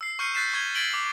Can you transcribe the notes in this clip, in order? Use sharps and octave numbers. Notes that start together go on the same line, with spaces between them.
E6 C7
C#6 F6 G6 C7 C#7 D#7
F#6 G6 A6 B6 C7 E7
C#6 G#6 G7
G#6 A6 B6 D7 F#7 G7
D6